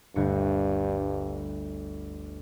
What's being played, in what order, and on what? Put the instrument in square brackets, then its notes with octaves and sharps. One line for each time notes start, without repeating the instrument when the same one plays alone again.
[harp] G1 D2 C#7 [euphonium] G2